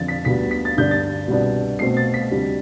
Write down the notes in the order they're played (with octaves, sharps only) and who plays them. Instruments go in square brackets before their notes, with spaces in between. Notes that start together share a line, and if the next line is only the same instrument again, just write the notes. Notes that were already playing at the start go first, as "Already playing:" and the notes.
Already playing: [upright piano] F2 D3 F3 A6
B6
D2 D3 G3 B3 B6
B6
A6
G2 D3 G3 D4 G6
A6
C2 B2 B3 D4
B2 A3 C4 C7
A6
B6
D2 C3 G3 D4